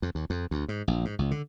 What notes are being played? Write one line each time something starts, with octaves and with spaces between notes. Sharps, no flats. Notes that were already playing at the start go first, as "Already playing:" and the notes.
F2
D#2
F2
D2
G#2
A#1
G#2
C#2
D3